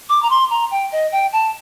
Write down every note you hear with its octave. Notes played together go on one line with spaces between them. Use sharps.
D6
A#5
C6
A#5
G5
D#5
G5
A5